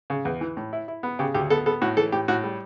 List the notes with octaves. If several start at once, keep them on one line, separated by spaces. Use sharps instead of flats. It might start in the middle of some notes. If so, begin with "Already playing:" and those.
C#3
E2
E3
A2
E4
E4
B3
C#3 G4
D2 G4
B3 A4
B3 A4
A2 F#4
E3 A4
A2 G4
A2 F#4
G3